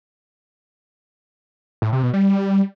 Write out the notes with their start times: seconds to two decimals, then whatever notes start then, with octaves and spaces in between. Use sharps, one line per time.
1.82 A2
1.93 C3
2.03 B2
2.14 G3